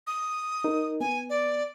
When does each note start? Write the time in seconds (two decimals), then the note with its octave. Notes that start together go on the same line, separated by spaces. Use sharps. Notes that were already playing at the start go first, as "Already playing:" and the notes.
0.07 D#6
0.64 D#4 A#4
1.01 B3 G#5
1.30 D5